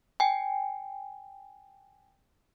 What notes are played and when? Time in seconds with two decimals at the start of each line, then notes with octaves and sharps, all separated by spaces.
0.20 G5 G#5